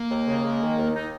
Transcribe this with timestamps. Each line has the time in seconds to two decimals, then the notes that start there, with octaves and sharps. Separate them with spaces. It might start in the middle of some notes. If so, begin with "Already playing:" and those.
Already playing: A#3
0.10 D#2
0.27 C#3
0.44 G#3
0.61 D#3
0.77 D#2
0.95 D#4